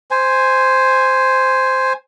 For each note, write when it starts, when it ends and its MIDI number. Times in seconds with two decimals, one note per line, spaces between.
0.11 1.93 72
0.11 1.93 80